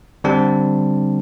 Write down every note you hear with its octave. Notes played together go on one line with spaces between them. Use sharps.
D3 G3 C4 D4